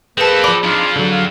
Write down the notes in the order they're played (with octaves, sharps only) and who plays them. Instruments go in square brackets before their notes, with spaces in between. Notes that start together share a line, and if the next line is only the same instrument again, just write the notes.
[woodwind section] A#3 B4 [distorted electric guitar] C4 A4 [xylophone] G#4 A5
[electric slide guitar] F3 D5 [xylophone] B5
[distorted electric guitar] F2 [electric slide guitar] D4 D#4 [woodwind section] F4
[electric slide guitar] D3 F#3
[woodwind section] F#4 F5